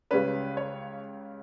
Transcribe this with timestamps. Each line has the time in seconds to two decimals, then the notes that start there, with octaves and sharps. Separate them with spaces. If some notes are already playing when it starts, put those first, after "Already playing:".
0.11 C#2 C#3 G3 C#4 B4
0.57 C#5